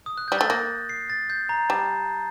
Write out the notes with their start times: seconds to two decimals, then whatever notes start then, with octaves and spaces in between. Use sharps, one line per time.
0.06 D#6
0.18 F#6
0.28 G3 G6
0.39 A3 A6
0.50 A#3 A#6
0.89 C7
1.10 A6
1.30 G6
1.49 A#5
1.69 G3 A5